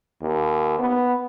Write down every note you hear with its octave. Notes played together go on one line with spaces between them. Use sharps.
D#2
B3